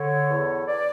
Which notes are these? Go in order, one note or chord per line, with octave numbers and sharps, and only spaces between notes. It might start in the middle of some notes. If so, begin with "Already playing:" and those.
Already playing: D3 C#5
E2
D5